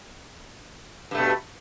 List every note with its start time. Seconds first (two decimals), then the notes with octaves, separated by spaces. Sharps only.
1.11 G2
1.15 A3
1.18 B2